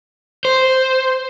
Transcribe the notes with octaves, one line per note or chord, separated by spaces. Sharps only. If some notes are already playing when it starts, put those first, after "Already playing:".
C5